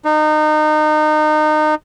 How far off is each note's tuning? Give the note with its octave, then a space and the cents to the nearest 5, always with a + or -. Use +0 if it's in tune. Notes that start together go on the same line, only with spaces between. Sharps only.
D#4 -25